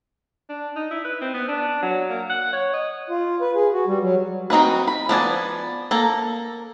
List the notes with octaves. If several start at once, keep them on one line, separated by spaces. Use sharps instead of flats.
D4
D#4
E4
B4
C4
B3
D4
F#3
A#3
F#5
C#5
D#5
F4
B4
G#4
F#4
G3
F#3
C4 D#4 F#4 B4
B5
F3 B3 D5 G#5
A#3 A4 A#5